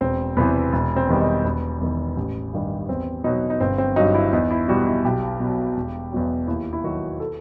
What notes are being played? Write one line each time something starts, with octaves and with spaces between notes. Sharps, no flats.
E1 C4
E2 C3 E3 B3
E1
C4
E2 D#3 G3
D#4
E1 B3
E2 D#3
A1
G2 D#3 G3
E2 C4
B2 F#3 D#4
D#4
G1 C4
C4
G2 F#3 D#4
E4
E2 D#4
E4
B2 G3 F#4
E4
B1 G4
B2
F#3
E1
E2 B2 F#3
D#2 E4
E4
D#3 F#3 F#4
A4